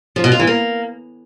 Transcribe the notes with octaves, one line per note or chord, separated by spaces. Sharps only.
F3
B2
F4
E3
A#3